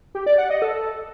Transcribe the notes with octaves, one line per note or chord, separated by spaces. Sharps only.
G4
D5
F#5
D#5
A4